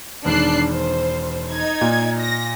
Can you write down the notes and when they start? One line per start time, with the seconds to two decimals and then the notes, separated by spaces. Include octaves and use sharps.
0.25 E1 D#3 D4 F#6 C7
0.70 C5
1.52 D#4 G#6
1.81 A#2
2.20 A#6